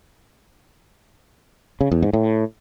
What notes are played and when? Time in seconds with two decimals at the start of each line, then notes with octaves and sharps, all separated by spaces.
1.81 C#3
1.92 E2
2.02 G#2
2.13 A2